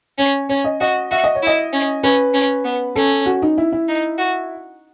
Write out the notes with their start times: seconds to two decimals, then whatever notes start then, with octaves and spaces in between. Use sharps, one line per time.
0.19 C#4 C#5
0.49 C#4 C#5
0.64 D#5
0.81 F#4 D#5
1.11 F#4 E5
1.24 D#5
1.35 C#5
1.42 E4
1.47 D#5
1.73 C#4
2.03 C#4 B4
2.34 C#4
2.65 B3
2.96 C#4 A4
3.26 F#4
3.42 D#4
3.58 E4
3.72 E4
3.88 D#4
4.18 F#4